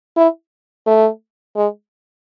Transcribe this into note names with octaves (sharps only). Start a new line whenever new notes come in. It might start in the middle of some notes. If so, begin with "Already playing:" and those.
E4
A3
G#3